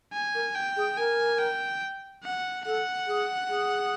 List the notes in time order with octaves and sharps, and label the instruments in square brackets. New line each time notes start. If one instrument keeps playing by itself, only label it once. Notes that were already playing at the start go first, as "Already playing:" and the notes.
[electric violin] G#5
[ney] A#4
[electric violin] G5
[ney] G#4
[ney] A#4 [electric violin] G#5
[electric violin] G5
F#5
[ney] A4 [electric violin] F#5
[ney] G#4
G#4